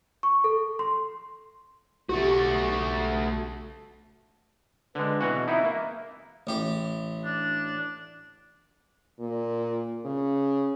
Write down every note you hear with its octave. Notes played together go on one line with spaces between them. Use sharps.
C#6
A4
C6
B1 A3 F#4 G4
D3 G#3 B4
B2 E3 C4 F#4
B3 D#4 E4 E5
A#3
A1 G4
D4
A#2
C#3